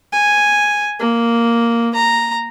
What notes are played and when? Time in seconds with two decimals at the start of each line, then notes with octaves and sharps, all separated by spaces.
0.12 G#5
0.99 A#3
1.95 A#5